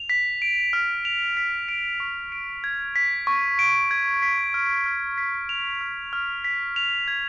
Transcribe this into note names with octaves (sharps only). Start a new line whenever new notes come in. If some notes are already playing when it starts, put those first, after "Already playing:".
Already playing: F7
B6
D7
F6
F7
B6
D7
C#6
D7
G#6
B6
C#6
D7
G#6
B6
F6
F6
B6
F7
F6
F6
B6
F7
G#6